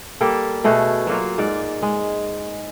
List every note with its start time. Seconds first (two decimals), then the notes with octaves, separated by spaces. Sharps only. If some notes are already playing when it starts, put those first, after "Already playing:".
0.21 G3 A#3 G4 A4
0.64 B2 A3 F#4 G#4
1.07 F#3 A#3 F4
1.38 G#2 D5
1.82 G#3